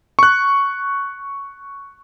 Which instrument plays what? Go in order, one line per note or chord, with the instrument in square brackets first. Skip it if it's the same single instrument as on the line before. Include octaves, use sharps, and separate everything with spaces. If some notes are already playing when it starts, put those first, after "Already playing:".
[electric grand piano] C#6 F#6